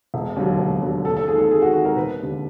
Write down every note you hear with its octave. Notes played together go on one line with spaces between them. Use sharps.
E1
D#2 D3 F#3
E1
D#2 D3 F#3
D#2 A4
A4
D#3 G#3 G#4
A4
D#2 G#4
F#4
D#3 G#3 F#4
A#4
E1 B4
D#2 D3